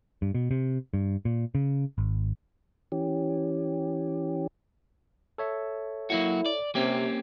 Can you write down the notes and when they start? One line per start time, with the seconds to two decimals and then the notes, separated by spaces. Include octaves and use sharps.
0.22 G2
0.35 B2
0.51 C3
0.94 G2
1.25 A#2
1.55 C#3
1.98 G#1
2.92 E3 C#4 G4
5.38 A4 C#5 E5
6.10 F#3 A#3 E4 F#4
6.46 D5
6.75 C3 A#3 C4 C#4 G4